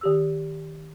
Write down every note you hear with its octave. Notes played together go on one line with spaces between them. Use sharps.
D#3 G4 E6